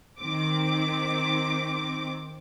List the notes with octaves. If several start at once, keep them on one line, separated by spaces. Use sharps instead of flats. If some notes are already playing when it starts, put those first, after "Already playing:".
D#3 C4 D6